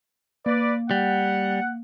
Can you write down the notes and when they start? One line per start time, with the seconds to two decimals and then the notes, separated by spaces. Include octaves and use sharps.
0.46 A#3 B4 D5
0.91 G3 F#5